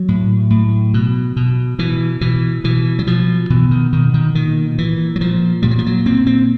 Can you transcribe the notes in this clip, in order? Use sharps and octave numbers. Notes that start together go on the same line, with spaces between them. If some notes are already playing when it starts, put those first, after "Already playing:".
Already playing: F#3
A2
A2
B2
B2
B2 E3
B2 E3
B2 E3
F#3
B2 F3
B2 E3
D#3
B2 D#3
D#3
A#2 D#3
A#2 E3
F#3
A#2 F3
A#2 G3
F#3
F3
F#3
A#2 C4
C4